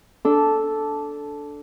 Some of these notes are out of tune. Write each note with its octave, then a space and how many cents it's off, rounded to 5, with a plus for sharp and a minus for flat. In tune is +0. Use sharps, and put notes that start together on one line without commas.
D4 -10 A4 -5